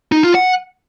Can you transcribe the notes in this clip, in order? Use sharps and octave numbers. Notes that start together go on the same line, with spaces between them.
D#4
F4
F#5